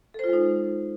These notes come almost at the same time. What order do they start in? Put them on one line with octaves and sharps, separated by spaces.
A4 C5 F4 G#3 D#4